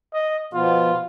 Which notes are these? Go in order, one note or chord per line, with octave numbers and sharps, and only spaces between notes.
D#5
B2 F3 B3 F4